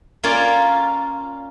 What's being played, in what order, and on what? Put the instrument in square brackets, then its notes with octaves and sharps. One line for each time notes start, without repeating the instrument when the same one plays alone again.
[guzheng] A#3 C#4 F4 C#5 D5